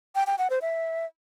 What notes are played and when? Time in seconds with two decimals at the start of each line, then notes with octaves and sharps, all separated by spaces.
0.15 G5
0.27 G5
0.38 F#5
0.50 C5
0.62 E5